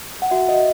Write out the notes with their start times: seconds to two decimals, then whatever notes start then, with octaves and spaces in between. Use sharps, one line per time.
0.22 F#5
0.31 F#4 E5
0.48 F#4 D#5